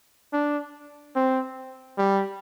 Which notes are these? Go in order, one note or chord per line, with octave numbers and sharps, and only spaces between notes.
D4
C4
G3